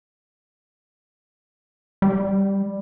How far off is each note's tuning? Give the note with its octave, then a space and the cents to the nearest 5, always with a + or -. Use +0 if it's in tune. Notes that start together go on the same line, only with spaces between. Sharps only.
G3 +5